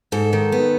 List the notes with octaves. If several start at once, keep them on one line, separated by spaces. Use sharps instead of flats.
G#2 A4
D#3
B3